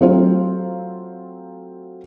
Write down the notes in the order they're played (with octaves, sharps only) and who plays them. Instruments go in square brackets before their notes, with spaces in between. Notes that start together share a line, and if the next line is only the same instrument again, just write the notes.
[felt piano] F#3 A3 C4 F4 F#4 C5